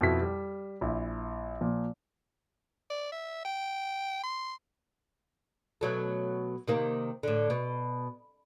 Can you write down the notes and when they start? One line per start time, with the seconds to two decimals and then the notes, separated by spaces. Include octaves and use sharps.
0.01 F2 B2 E4 B6
0.22 G3
0.81 A#1 E4
1.61 A#2 F3
2.90 D5
3.12 E5
3.45 G5
4.24 C6
5.81 B2 F#3 A3
6.68 C3 D#3 A#3
7.23 A2 D3
7.50 B2